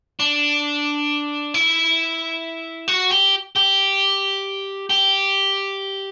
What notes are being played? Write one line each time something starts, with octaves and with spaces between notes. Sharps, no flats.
D4
E4
F#4
G4
G4
G4